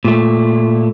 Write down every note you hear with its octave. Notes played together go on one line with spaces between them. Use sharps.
A#2 A3